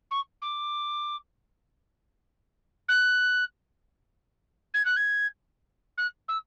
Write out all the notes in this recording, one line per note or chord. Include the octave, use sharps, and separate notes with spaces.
C#6
D6
F#6
G#6
F#6
G#6
F#6
E6